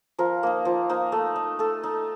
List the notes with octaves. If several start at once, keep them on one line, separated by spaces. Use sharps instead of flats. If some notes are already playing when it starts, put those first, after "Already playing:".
F3 A#4
A#3 D#4
F3
A#3 D#4
A3
D#4
A3 A4
D#4